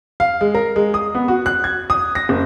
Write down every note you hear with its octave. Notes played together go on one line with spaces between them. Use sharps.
F5
G#3
A#4
G#3
D#6
B3
F#4
F#6
G#6
D#6
A#6
F#1